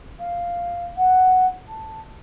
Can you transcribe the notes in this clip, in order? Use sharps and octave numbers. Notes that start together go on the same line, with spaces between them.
F5
F#5
A5